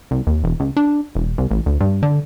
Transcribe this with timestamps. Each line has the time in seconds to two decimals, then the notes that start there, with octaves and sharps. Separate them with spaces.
0.11 C2
0.27 D#2
0.44 E1
0.60 C#2
0.77 D4
1.15 E1
1.38 C2
1.51 A1
1.66 D2
1.80 G2
2.03 D3